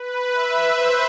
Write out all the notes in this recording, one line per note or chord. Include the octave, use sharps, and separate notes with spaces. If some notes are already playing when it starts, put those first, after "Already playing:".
Already playing: B4
E5
C5